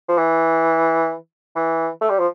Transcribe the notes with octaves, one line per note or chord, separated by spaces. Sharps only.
F3
E3
E3
A3
G3
F3